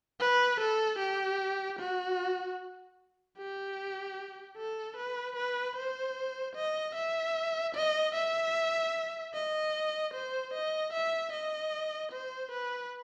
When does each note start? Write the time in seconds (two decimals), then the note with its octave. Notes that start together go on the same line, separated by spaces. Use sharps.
0.20 B4
0.60 A4
0.99 G4
1.79 F#4
3.38 G4
4.57 A4
4.96 B4
5.36 B4
5.76 C5
6.56 D#5
6.95 E5
7.75 D#5
8.15 E5
9.34 D#5
10.14 C5
10.54 D#5
10.93 E5
11.32 D#5
12.12 C5
12.51 B4